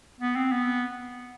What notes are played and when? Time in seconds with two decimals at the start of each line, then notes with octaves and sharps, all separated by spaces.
0.20 B3
0.36 C4
0.52 B3